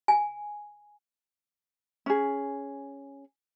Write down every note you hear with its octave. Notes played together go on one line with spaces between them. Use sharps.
G#5
C#4 G#4